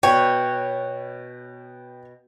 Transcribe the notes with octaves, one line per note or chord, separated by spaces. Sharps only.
B2 B4 C#5 G5